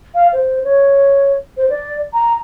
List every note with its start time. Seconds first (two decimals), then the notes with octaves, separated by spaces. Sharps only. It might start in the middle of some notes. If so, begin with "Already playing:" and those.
0.15 F5
0.33 C5
0.64 C#5
1.57 C5
1.70 D5
2.14 A#5